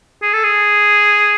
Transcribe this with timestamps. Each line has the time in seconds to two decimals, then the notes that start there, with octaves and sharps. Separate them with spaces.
0.23 G#4
0.33 A4
0.44 G#4